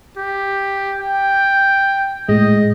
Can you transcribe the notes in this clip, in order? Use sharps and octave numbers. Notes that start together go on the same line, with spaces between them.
G4
G5
A2 G#3 D#5